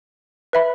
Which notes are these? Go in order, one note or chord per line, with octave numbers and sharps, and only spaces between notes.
B4 E5 B5